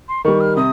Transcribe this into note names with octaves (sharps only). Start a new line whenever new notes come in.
C6
D#3 G3 C#6
F6
C3 D#6